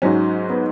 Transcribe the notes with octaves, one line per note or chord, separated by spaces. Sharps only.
G#2 F#3 C#4
B3